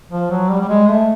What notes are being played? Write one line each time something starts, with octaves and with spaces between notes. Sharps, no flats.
F3
F#3
G3
G3
G#3
A3